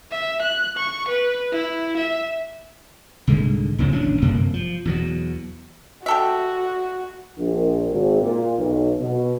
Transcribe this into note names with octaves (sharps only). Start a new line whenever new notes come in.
E5
F#6
C#6
B4
E4
E5
C2 G#2 D3 G#3
D2 C#3 F#3 C4
D#1 A1 C#4 D4
G1 F#2 C3 A#3
F3
E2 B2 F#3
F#4 G4 A4 E5
A#1
G#1
A#2
B1
B2